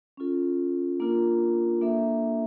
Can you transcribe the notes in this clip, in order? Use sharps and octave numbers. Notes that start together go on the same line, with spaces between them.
C#4 F4 A4
A#3 D4 F4 A#4
A#3 D4 A4 E5